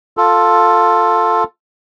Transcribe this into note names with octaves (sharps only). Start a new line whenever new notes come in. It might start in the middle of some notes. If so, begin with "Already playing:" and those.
F4 A4